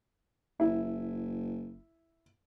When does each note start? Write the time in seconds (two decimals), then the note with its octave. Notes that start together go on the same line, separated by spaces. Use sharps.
0.60 F#1 E4